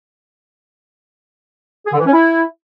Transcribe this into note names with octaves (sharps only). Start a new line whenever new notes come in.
G#4
D3
E3
C#4
E4